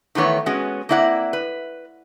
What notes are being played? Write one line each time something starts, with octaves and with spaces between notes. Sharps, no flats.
D#3 E3 A3 B3 C#5
G#3 B3 C#4 F#4
A#3 C4 E4 D5 F#5
B4